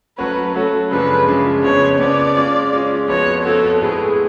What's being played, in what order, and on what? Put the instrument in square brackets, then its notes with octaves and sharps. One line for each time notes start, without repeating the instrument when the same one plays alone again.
[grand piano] F#3 A3 C#4 F#4 C#5 [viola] B4
[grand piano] F#3 A3 C#4 F#4 C#5 [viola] A4
[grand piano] F#2 C#3 F3 G#3 D4 [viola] B4
[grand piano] F#2 C#3 F3 G#3 D4
[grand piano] F2 C#3 F3 B3 [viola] C#5
[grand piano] F2 C#3 F3 B3 [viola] D5
[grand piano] G#3 C#4 F4
G#3 C#4 F4
[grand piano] F2 F3 B3 F#4 [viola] C#5
[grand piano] F2 F3 B3 F#4 [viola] A4
[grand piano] A2 G#3 B3 [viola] G#4